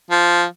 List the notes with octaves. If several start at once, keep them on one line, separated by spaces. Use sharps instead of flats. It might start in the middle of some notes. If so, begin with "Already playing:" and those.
F3